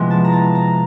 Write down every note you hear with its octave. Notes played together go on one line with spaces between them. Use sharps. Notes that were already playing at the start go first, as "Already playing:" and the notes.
Already playing: C3 F3 G#3 B3 E4
A5
A#5
A5
A#5